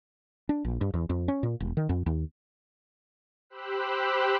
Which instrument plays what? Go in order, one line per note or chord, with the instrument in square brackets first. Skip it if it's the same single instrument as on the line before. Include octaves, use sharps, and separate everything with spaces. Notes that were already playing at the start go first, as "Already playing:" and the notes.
[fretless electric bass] D4
A#1
G2
E2
F2
C#4
A#2
E1
D#3
F2
D#2
[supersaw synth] G4 C5 B5 E6 F#6